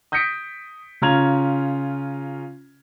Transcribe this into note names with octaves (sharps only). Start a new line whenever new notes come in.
D#6 G6 A#6 B6 C#7 D7
C#3 C#4 F4 A#5 G#6 F7